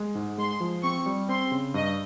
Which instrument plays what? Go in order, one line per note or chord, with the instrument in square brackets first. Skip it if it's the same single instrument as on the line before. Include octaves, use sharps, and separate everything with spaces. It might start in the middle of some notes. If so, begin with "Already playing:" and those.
Already playing: [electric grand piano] G#3
G#2
[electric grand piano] G#3 [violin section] C6
[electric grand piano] F3
[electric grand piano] C4 [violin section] C#6
[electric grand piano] G3
[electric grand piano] C4 [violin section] C6
[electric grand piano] C#3
[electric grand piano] G2 [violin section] D#5